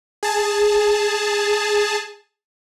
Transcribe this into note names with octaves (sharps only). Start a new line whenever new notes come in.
G#4 A5